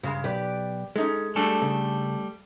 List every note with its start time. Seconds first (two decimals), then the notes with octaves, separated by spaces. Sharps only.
0.03 G2 C#3 G#3
0.24 B1 G4 B4 D5
0.96 G#3 C#4 D#4 A4
1.36 G3 A3 D4 A4 G#5
1.62 C#3